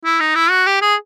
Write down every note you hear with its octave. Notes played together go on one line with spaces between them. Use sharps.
E4
D#4
E4
F#4
G4
G#4